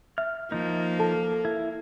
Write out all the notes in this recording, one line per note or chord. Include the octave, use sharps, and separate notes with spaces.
E5 F6
F3 A#3 D#4
A4 A5
E4